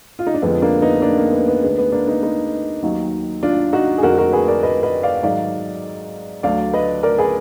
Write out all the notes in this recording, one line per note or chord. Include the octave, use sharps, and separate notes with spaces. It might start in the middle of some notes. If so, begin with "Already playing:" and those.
F4
D#4
D4
F2 D3 F3 G#3 B3
A#3 D4
B3 D#4
A#3 D4
A#3
B3
B3
D2 D3 G#3 B3
B3
A#3 D4
B3 D#4
B3 D#4
D#2 D#3 F#3
D4 F4
D#4 F#4
G#4
F2 D3 G#3 F#4 A#4
F#4 A#4
G#4 B4
A#4 D5
B4 D#5
B4 D#5
D5 F5
G#2 D#3 F#3 D5 F5
D2 D3 F#3 D5 F5
B4 D#5
A#4 D5
G#4 B4